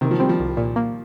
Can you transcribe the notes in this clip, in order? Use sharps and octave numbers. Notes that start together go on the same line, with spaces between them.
C3 D#3
F3
G3 C4
F3
C2
A#2
A#3